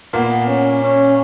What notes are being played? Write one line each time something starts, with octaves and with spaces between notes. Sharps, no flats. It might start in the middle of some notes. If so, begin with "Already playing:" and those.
A#2 A#3 B3
C#4
C#4